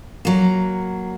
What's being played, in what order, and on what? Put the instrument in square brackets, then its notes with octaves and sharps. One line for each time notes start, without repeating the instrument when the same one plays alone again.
[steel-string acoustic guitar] F#3 A#3